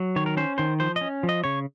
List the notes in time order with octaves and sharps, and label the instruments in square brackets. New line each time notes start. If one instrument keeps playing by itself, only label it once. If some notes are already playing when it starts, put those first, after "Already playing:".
Already playing: [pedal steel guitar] F#3
D#3 C#5
A#4
C#4 C5
D#3 C5
F3 C5
D#5
C#4
F3
D#5
C#3 C#5